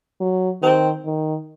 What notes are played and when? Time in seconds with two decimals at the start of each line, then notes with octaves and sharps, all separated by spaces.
0.20 F#3
0.62 D#3 C4
1.05 D#3